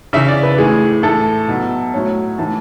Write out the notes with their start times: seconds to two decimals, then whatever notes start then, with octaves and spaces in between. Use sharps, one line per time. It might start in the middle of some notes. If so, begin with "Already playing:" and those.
0.13 C#3 E3 E5
0.28 D5
0.43 B4
0.58 A2 E3 G#4
1.03 A2 E3 A4
1.48 B2 F#3
1.94 A2 F#3 C#5
2.38 A2 E3 A5